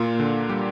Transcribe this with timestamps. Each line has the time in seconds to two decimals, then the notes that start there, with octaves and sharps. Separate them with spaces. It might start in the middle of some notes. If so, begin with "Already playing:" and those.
Already playing: A#2 A#3 F4
0.20 D3
0.49 G3 G4